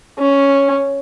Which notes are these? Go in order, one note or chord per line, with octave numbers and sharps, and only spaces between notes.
C#4